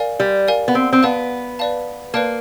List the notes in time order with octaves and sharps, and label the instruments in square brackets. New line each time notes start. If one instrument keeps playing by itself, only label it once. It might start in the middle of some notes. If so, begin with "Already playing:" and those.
Already playing: [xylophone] A#4 D5 F5 G#5
[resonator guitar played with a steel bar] G3
[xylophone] A#4 D5 F5 G#5
[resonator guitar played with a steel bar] B3
C4
C4
[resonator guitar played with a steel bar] B3 [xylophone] B4 D5 F5 A5
[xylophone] B4 D5 F5 A5
[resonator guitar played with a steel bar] A#3 [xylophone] B4 D5 F5 A5